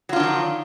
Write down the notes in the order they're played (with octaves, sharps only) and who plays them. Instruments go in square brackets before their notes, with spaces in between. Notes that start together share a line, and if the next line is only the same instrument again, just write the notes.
[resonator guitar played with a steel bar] F#3
F4
D4
D#3
F3